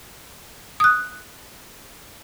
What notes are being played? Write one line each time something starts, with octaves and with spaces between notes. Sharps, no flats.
D#6 F#6